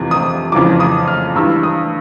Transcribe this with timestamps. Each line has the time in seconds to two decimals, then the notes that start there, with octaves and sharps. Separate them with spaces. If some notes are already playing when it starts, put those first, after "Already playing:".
Already playing: F2 C3 E3
0.11 D#6
0.52 F2 C#3 E3 D6
0.80 D#6
1.08 F6
1.35 G2 E3 E6
1.63 D#6